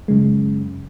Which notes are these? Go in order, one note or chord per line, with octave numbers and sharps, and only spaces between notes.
F#2 C#3 G#3